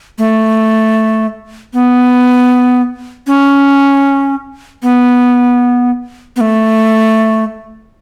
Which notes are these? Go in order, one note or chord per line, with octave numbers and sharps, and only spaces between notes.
A3
B3
C#4
B3
B3
A3